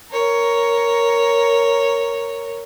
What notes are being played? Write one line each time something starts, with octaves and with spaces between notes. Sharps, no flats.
A#4 C#5